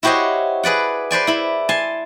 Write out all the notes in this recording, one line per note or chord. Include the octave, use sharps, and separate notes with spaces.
E4 F#4 G4 C5 C#5 D#5
G#4 B4 D5 F#5
B4 C5 D5 G#5
E4 B5
G#5 A5 C6